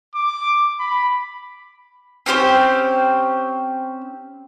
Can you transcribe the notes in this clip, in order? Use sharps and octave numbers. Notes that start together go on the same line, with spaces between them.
D6
B5
C4 C#4 G4 C5